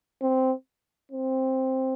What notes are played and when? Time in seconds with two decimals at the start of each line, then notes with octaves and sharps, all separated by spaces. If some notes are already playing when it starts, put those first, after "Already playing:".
0.22 C4
1.12 C4